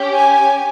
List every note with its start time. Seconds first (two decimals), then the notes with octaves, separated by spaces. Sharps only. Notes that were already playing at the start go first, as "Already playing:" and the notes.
Already playing: C#4 G4
0.17 G#5